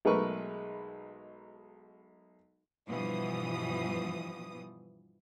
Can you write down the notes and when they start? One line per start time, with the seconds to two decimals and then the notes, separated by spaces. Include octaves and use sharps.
0.05 B1 G#3 A3 A#4 B4 C#6
2.88 G2 B2 E3 F3 D#6